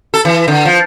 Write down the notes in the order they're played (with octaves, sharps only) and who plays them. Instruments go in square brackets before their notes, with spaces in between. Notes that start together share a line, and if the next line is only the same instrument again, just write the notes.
[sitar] A4
E3
D3
F3